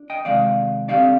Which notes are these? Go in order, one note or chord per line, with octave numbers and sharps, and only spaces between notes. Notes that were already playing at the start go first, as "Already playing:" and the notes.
Already playing: D4
D#5 G5
C3 D#3 G#3 D5 F5
D3 G3 C4 D5 F5